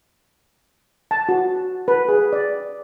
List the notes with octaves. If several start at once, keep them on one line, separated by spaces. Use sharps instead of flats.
A5
F#4
B4
G#4
D5